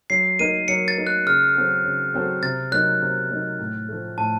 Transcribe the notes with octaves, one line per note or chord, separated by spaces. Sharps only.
F#3 C7
A#3 D#4 A#4 D#7
F#3 C#7
A6
A#3 D#4 A#4
F#6
C#3 F6
F#3 C4 F#4 A4
C#3
F#3 C4 F#4 A4
C3 A6
F#3 A#3 D#4 F#6
C3
F#3 A#3 D#4
A2
F3 A3
A2 A5